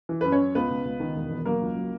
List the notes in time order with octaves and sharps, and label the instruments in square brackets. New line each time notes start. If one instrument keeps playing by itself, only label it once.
[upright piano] E3
F#2 B4
C#4 C#5
F#2
C#2 B3 B4
C#2
C#2
D#3
E1
E2
F#3 A#3 A#4
C#2
F#3